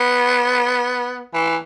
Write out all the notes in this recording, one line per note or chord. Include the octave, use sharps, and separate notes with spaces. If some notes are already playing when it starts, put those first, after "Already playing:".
Already playing: B3
E3